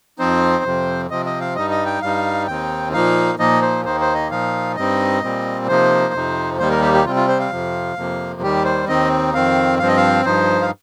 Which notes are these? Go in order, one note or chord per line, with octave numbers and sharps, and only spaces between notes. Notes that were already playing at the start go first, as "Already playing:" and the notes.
F2 F3 C4 D#4 C5
F2 C3 F3 C4
C3 F3 C4 D#5
D#5
F5
G2 G3 D#4 D#5
D#5
G5
G2 G3 D#4 F5
D#2 D#3 C4 D#4 G5
A#2 F3 A#3 D#4 F5
A#2 F3 A#3 D#4 D#5
C5
D#2 D#3 A#3 D#4 C5
C5
D#5
A#2 F3 D#4 F5
G2 G3 C4 D#4 D#5
A#2 G3 C4
C3 F3 A#3 D#4 C5
F2 C3 F3 D#4
D#2 D#3 G3 A#3 D#4 C5
A#4
G4
G4
C3 G3 C4 F4
F4
C5
F5
F2 C3 F3
F2 C3 F3 A#3
D#2 D#3 G3 G4
C5
D#2 D#3 C4 D#4 D#5
F2 D#3 C4 F5
G2 F3 C4 F5
D#5
F5
G2 F3 D#4 C5
F5